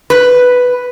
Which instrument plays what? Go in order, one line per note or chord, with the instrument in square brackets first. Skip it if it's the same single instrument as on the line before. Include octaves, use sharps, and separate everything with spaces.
[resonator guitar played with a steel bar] B4